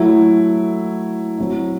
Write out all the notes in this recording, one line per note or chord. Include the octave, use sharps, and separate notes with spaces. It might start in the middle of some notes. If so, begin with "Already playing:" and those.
Already playing: F#3 A3 E4
F#3 C4 E4